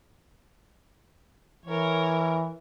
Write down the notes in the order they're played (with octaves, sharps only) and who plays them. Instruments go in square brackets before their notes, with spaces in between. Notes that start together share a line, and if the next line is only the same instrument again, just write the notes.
[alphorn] E3 [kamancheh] A#4 C#5